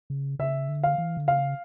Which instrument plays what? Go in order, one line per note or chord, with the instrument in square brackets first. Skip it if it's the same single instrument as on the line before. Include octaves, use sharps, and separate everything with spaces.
[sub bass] C#3
[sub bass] C#3 [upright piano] E5
[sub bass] D3
[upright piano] F5
[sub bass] E3
D3
[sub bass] C#3 [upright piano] F5